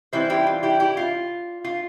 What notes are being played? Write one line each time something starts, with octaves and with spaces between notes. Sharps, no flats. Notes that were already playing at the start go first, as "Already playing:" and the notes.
E3 G3 C4 E4 C5 E5
E4 G4
F4
E4 G4
E4 G4
F4
F4